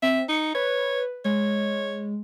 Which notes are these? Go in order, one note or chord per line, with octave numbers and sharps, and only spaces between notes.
C4 E5
D#4 C#7
B4 C#5
G#3 C#5